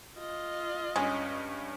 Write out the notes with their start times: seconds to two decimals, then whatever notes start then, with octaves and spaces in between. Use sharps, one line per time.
0.18 F4 D#5
0.96 G2 G#3 C#4